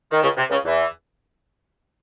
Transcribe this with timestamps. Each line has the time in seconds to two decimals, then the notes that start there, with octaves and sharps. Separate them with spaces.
0.12 D#3
0.23 C#2 C#3
0.37 C3
0.50 C#2 C#3
0.64 E2 E3